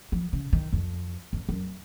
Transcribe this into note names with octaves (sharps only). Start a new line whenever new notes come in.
F3
C#3
D#3
F2
F2
F#2